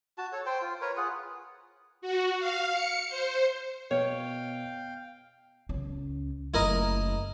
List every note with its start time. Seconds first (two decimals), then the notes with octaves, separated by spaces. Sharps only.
0.18 F#4 A5
0.32 A4 C#5
0.46 C5 G5
0.62 F4
0.81 A#4 B4 C#5
0.97 F4 G#4 F#5
2.02 F#4
2.39 F5
2.72 C#7
3.09 C5
3.91 B2 C#5 F5 G5
5.69 C#2 C#4
6.54 F#1 A3 E4 A#4 D#5